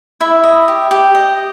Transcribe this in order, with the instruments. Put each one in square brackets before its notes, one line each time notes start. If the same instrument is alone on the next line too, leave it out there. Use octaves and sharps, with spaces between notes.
[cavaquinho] E4 E5
D#5
G4
G4
D#5